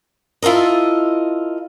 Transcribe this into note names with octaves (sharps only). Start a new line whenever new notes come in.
E4 F4 A4 A#4 D#5